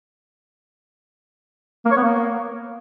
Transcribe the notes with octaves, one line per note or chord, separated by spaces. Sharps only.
A#3
C#5
B3
A#3